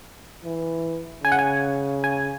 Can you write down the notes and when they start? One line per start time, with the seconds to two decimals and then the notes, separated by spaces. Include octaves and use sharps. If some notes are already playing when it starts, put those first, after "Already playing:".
0.45 E3
1.24 C#3 G#5
1.32 F#5
1.39 G#5
2.04 G#5